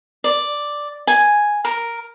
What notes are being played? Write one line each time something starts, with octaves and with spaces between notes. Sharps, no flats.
D5
G#5
A#4